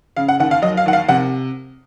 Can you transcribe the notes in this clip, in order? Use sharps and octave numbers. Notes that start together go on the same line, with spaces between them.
C#3 F5
F#5
D#2 F#5
F5
F#3 D#5
F5
D#2 F#5
F5
C3 F#5